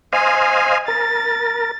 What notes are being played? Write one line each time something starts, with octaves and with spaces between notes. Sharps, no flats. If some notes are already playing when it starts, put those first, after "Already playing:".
C5 D#5 F5 G#5
A#4 A6